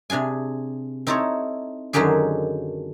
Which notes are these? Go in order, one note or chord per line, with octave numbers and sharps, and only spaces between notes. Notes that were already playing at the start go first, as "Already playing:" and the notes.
C3 D4 G#4 G#5
C4 D#4 E4 A4 C#5
F#2 D3 D#3 F#3 G4 G#4